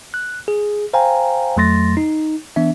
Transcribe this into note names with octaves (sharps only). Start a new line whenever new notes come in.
F#6
G#4
C5 F5 G5 G#5 A#5
F2 F#3 A3 C6 A6 A#6
D#4
E3 B3 D4 E5